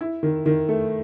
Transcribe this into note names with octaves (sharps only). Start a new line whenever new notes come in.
E4
D#3
D#3
A3